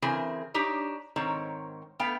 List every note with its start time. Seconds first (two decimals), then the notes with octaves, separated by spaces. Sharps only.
0.02 C#3 E3 C4 G#4 A#4 G#5
0.54 D4 D#4 G4 C#5
1.16 G#2 D#3 C4 C#5 A#5
1.99 A3 B3 F5 G5